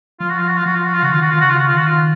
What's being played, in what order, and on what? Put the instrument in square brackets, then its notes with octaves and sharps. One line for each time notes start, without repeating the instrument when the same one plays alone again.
[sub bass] F3 [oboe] F4
[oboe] F#4
F4
F#4
F4
[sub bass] F3 [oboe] F#4
[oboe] F4
F#4
F4
[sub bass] C#3 [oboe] F#4
[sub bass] D#3 [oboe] F4
[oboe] F#4
[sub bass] D#3 [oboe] F4
[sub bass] C#3 [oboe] F#4
[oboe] F4
F#4
F4
[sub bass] D#3 [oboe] F#4
[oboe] F4